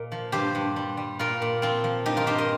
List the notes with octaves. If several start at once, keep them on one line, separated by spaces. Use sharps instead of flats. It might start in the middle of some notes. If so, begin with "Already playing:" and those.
Already playing: A#2 A#4 D#5
F3
G2 G4 C5
G2
G3
G3
A#2 F4 A#4
A#2
F3 C4 F4
F3
G2 D#4 G4
F4 A#4
G2 G4 C5
A#4 D#5